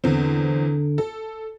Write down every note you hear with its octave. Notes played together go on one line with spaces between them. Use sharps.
E2 D3 C4
A4